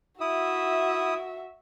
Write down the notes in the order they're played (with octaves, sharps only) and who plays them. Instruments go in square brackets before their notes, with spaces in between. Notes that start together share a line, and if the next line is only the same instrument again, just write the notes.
[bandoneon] E4 D#6 [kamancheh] F#4 E5